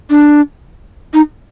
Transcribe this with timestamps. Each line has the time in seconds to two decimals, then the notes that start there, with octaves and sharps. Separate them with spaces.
0.10 D4
1.13 D#4